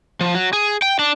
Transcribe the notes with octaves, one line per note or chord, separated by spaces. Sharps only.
F3
F#3
G#4
G5
D4